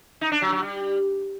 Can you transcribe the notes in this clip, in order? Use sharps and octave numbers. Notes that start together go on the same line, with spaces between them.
D#4
D4
F#3
F#3
G3